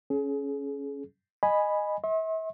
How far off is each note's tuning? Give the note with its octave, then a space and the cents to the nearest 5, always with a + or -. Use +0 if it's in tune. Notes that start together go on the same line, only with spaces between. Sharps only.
C#4 +0 G#4 +35
D#5 -15 G#5 +0 B5 +0
E5 -40 C6 +40